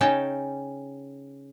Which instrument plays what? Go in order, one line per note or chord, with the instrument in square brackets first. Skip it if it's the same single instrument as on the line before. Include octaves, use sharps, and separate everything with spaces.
[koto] C#3 C#4 D#4 G5 A5